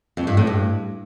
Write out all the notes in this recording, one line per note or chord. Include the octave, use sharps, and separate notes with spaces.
F2
G2
A2
G2